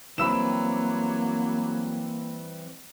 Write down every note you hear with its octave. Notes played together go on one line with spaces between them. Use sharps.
E3 F#3 G3 A#3 C4 B5 E6 E7